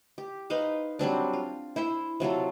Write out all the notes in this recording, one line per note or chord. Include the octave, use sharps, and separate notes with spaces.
G4
D#4 B4 C5 F5
F#3 G3 C4 D4
F4
E4 C5 E5
C3 F#3 F4 A4